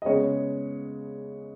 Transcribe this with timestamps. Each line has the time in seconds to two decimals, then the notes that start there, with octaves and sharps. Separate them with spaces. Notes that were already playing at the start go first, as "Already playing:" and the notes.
0.02 D#5
0.05 C#3 G#3 B3 C#5